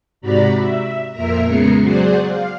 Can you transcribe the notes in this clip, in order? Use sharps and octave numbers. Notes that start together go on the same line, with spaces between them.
G#2 C3 F#4 D5 A#5 B5
E5
F2 A#2 A#4 E5 A#5
C#3 G#3 B3 A#5 C7 C#7
F#3 G#4 C5 D5 F#5
F5